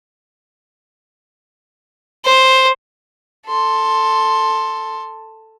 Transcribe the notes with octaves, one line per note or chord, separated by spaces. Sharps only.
C5
A4 C6